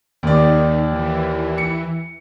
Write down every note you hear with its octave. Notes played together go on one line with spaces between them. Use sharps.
D#2 D#3 D5
E3
C#7